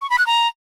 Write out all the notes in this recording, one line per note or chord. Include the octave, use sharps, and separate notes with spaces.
C#6
B5
F#6
A#5